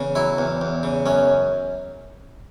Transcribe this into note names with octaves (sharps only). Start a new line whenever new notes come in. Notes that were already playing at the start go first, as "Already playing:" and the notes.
Already playing: E2 C#3
F#3 E4
E2
E2
C#3
F#2 C#4